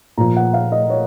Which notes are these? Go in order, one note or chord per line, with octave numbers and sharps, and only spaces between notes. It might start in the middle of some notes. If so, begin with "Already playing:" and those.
A#2 F3 A#5
F#5
F5
D#5
C#5